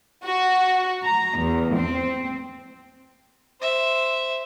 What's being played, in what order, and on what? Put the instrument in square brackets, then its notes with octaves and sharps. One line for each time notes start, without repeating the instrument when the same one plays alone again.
[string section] F#4
A#5
E2
C4
[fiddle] C5 E5